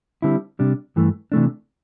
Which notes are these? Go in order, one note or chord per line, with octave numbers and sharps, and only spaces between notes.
D3 G3 C4 E4
C3 G3 D4
G2 E3 A3
C3 E3 A3 D4